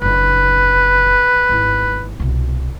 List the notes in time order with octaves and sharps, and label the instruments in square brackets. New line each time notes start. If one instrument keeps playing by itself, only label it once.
[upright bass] F#1 D4 [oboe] B4
[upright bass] G#1 E4
C2 B2